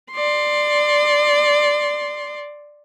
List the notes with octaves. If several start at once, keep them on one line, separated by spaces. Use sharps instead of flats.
D5 C6